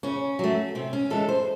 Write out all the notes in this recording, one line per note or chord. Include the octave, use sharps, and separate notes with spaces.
C#3 C#4
F#3 A3
C3 C4
C#4
E3 G#3 A4
C5